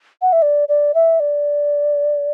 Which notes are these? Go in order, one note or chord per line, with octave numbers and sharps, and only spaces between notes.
F#5
E5
D5
D5
E5
D5